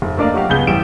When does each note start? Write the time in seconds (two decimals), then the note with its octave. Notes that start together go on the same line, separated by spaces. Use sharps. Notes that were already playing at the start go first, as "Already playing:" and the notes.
0.02 F1
0.17 A3 A#3 D4 D5 D#5 F5
0.34 F#3 F#4 G4 F5
0.49 C#2 B3 G#4 G6 G7
0.67 A1 E3 G3 D7 E7